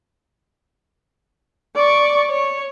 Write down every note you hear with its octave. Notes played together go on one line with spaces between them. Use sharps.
D5 C#6
C#5